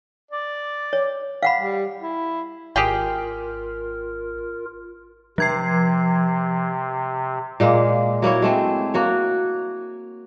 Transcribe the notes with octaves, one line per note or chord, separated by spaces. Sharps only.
D5
C#5
F5 F#5 B5
G3
E4
G#1 F4 G4 G#4 A#4 G5
C3 F3 G#6 C7
A#2 G#3 A#3
F#3 A#3 E4 C#5
G#3 A3 C4
A#3 F#4 C#5